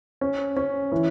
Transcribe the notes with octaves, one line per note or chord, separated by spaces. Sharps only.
C#4
C#4
E3